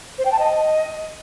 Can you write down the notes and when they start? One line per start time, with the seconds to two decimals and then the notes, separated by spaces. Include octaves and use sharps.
0.18 C5
0.25 G5
0.32 A5
0.39 D#5